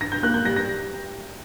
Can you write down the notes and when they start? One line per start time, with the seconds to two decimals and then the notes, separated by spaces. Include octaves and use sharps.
0.01 G2 A#6
0.12 G6
0.23 A#3 F#6
0.34 G6
0.45 G3 A#6
0.56 A#6